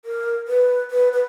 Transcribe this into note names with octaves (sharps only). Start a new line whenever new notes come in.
A#4
B4
B4
B4